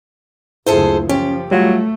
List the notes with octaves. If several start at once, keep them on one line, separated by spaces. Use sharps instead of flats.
F#1 D2 E4 F4 G#4 A4 C5
F3 C#4 G4
F#3 G3 A3 F4